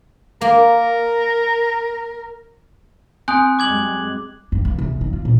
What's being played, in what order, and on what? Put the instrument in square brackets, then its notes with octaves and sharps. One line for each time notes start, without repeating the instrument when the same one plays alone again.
[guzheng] A#3 [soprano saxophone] A#4
[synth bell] C4 [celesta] G#5 D#6 [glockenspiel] F#6
[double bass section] F#2 G3 G#3 [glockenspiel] D6 G#6 F#7
[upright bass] G2
C#2
C2
D#3
F4
A#2